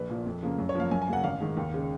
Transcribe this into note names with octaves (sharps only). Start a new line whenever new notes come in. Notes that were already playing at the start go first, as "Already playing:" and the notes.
Already playing: A#1 B4
A#2 F3
F2
C#3 F3 A#3
F#2
C#5
F3 A#3 F5
F#2 G#5
G#5
C#3 F#3 A#3 F#5
G#1 F5
G#2 D#3
D#2
C#3 G#3